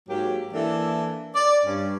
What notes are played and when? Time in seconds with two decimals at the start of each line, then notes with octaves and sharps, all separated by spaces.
0.08 G#2 F#3 A#3 G4
0.53 E3 A#3 D4 E4 A4
1.35 D5
1.65 G2 C#4